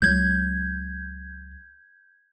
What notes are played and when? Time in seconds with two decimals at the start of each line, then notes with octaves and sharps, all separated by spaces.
0.02 C#2 F#3 G6 G#6